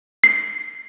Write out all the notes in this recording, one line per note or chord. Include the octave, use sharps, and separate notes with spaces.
C7